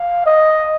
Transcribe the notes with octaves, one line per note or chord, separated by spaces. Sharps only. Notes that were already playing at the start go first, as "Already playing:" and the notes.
Already playing: F5
D#5